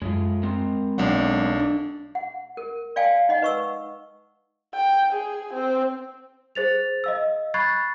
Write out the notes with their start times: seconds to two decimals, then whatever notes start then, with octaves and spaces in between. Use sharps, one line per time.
0.02 F#2 G#3 A3 F4
0.43 G#3 C4 A#4
0.98 B1 F#3 D4 F#5
1.59 D4
2.15 F#5
2.57 A#4
2.96 D5 F5 G5 G#5
3.29 D#4 D#5 F#5
3.42 B4 C#6 E6
4.75 G5
5.13 G#4
5.53 C4
6.55 G#4 C5 A6 F7
7.04 D#5 F5 E6
7.54 B5 C#6 F#6 G#6 A6 C7